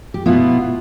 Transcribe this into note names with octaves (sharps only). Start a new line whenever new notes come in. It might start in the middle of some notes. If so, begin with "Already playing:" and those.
G4
B2 B3 E4 F4